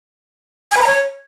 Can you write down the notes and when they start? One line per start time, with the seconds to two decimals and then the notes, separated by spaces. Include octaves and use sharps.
0.71 G#5
0.76 B4
0.82 A#5
0.87 C#5